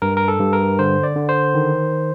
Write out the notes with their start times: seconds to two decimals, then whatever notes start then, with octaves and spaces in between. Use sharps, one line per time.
0.02 G2 A#4
0.17 A#4
0.28 A4
0.40 G2
0.53 A#4
0.79 D3 C5
1.03 D5
1.16 D3
1.29 C5
1.55 D#3